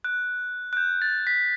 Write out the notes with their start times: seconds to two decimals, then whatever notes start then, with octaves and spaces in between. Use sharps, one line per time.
0.04 F#6
0.73 F#6
0.77 G6
1.02 A6
1.27 B6